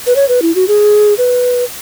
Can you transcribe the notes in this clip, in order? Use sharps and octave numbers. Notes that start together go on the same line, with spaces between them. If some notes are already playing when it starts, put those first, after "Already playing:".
B4
C#5
B4
E4
F#4
G#4
B4